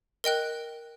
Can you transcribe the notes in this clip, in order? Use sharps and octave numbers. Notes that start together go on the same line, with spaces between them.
A#4 D#5 G5 F#6